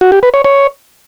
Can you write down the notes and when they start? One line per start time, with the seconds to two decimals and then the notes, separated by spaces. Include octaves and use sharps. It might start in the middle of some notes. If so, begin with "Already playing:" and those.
0.01 F#4
0.12 G4
0.23 B4
0.34 C#5
0.44 C#5